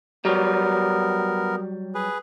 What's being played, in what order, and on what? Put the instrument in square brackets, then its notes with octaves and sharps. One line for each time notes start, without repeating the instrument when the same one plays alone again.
[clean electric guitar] F#3 G3 [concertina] B3 A#4
[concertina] G#4 B4